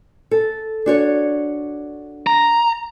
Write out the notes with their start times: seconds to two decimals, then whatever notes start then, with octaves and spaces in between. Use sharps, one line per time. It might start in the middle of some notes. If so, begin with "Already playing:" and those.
0.31 A4
0.86 D4 F#4 C#5
2.27 A#5